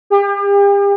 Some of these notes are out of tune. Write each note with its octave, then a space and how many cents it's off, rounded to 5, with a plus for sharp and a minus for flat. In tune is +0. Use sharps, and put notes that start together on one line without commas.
G4 +40